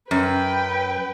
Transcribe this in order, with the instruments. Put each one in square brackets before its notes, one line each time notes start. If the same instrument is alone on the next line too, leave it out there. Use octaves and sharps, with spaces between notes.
[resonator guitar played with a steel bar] F#2 [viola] B4 G5